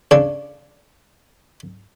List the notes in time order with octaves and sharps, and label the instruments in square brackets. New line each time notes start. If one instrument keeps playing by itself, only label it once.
[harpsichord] C#3 D4